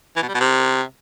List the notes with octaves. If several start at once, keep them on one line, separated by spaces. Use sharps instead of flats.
E3
B2
G3
B2
C3